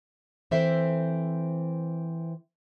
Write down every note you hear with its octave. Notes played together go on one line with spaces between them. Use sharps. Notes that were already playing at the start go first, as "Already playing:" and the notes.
E3 C4 A4 C5 E5